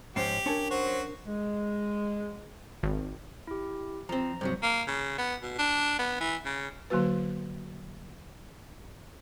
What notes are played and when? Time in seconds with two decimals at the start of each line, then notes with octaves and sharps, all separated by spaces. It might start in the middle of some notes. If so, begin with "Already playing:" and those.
0.16 G#2 F3 C#4 G4 C7
0.46 C#4 D4 A#4 C#5 A5
0.71 F#3 F#4 C5
1.26 G#3
2.83 G#1
3.47 E4 G4
4.09 F3 C4 A#5
4.41 G2 C3 F#3 C5
4.63 A#3
4.87 C#3
5.18 B3
5.43 B2
5.58 D4
5.99 B3
6.20 E3
6.45 C#3
6.90 D3 F#3 A#3 F#4 B4